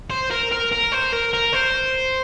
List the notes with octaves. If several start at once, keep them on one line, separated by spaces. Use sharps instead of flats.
C5
A#4
A#4
A#4
C5
A#4
A#4
C5